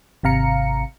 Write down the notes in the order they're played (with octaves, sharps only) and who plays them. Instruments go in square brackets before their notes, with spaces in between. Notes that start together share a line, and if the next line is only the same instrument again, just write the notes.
[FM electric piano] G#1 C3 F5 A#5 C#7